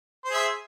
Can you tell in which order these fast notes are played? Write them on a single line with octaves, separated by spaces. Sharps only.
C5 G#4 E5